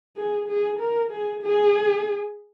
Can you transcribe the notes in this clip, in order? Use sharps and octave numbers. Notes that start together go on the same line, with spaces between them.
G#4
G#4
A#4
G#4
G#4